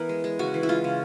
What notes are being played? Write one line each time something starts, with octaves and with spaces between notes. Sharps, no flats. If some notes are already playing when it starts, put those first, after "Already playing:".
Already playing: E3 B3 A#4
G#3
G#3
C#3 F#4
E3
E4
G#3 F4
C#3